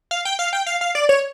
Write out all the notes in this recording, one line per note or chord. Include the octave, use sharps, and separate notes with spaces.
F5
G5
F5
G5
F5
F5
D5
C#5